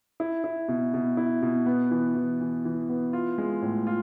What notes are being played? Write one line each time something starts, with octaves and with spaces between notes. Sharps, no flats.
E4
E4
B2
B2
E4
B2
B3
E3
E3
E3
E3
B3
F4
G#3
A2
F4